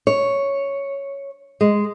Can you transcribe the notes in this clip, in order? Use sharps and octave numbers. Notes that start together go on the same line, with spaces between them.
C#5
G#3